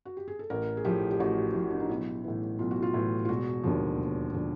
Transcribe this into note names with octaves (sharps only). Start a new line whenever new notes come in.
F#4
G4
G#4
A4
A1 A#4
G#4
A2 F3 G4
G4
A1 F#4
A2 F3
D4
D#4
B1 E4
A2 E3
B1 F4
F#4
F4
A2 E3
F4
E1 F#4
D#2 D3 F3
E1
D3 F3